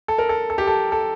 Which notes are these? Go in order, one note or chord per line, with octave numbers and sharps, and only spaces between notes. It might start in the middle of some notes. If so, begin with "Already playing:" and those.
A4
A#4
A4
A4
G4
A4
A4